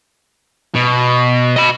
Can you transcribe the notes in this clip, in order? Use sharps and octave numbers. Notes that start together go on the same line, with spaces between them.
B2
D#5 B5